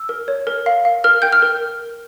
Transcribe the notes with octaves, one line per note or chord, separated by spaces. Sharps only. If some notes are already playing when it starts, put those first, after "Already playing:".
Already playing: E6
A#4
C#5
A#4
F5
F5
A#4 F6
G5 G6
F6
A#4